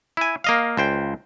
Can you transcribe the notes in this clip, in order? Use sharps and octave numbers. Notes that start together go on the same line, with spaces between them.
E4 G#5
A#3 D#5 F5
C#2 C5 G5